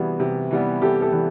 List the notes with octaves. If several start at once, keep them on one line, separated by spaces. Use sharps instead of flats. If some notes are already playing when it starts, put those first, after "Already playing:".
Already playing: C3 E3 G3 B3 F#4 G#4
C3
E3 G3 B3
C3 G4 A4
G4 A4
E3 G3 B3